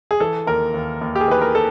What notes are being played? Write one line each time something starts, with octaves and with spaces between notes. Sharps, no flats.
G#4
E3 A4
D#2 A#4
D#2
D#2
G4
G#4
E3 B4
A#4
A4